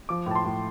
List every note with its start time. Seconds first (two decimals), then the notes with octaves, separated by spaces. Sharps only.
0.09 F3 D6
0.26 A2 A5
0.35 C6
0.45 A2